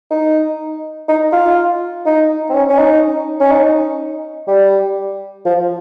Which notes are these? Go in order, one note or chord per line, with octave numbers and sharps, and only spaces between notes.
D#4
D#4
F4
D#4
C4
C#4
C#4
D#4
C#4
D#4
G3
F3